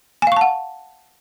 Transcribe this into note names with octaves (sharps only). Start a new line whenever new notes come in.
F5 F#5 G#5 A5 C#6